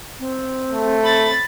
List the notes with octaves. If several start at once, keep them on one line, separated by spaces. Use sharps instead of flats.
C4
A3
B5 A6